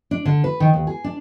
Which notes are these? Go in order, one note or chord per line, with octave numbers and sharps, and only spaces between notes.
D4
D3
B4
D#3
D#2
G#4
D4